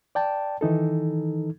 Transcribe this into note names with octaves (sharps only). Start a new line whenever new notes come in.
D5 G5 A5
D#3 E3 D#4 A4